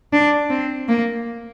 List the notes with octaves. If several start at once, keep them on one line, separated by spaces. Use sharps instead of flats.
D4
C4
A#3